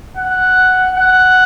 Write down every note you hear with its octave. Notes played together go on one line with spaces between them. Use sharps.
F#5
F#5